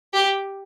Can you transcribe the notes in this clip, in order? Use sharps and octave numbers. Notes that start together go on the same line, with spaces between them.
G4